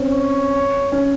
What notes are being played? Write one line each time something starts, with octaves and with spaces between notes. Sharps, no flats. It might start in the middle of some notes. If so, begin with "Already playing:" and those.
Already playing: C4 C#4
C#5
C#4